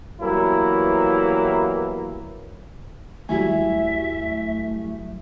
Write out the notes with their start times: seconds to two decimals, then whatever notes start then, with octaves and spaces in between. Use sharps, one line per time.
0.21 E3 F#3 G3 A#3 B3 E4
3.29 D#2 F#3 G3 A3 E4 E5 G#5